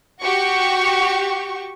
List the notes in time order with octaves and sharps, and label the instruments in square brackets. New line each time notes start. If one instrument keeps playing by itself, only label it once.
[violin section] F#4 G4 C#6